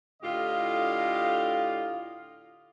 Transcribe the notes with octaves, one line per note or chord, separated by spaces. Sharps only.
A2 D3 F4 G4 D#5 F5